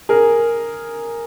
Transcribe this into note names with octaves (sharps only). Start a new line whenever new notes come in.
G#4 A#4